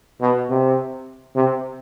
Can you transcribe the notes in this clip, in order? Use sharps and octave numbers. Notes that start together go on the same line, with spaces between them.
B2
C3
C3